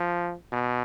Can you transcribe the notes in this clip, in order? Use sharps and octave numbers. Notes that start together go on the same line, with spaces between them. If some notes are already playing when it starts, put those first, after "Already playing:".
Already playing: F3
B2